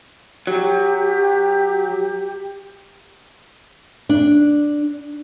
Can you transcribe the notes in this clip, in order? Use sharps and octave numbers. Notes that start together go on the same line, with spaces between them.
F#3 G4
D4